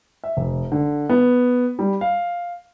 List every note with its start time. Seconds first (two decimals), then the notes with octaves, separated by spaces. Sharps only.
0.24 E5
0.37 F1
0.72 D3
1.09 B3
1.79 G3
2.01 F5